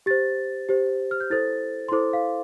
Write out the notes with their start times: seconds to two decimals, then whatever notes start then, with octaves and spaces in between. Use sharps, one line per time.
0.06 G4 C5 A6
0.69 G4 C5
1.11 F6
1.20 G6
1.30 E4 A4 C5 A6
1.89 C6
1.92 E4 A4 C5 D6
2.13 F5